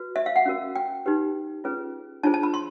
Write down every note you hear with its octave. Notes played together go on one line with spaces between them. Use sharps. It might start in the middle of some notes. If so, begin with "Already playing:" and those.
Already playing: F#4 B4
E5
F5
F#5
C#4 F#4 A#4
G5
D#4 G4 B4
C#4 F4 G#4 B4
D4 F4 G#4 C5 A5
A5
B5
C6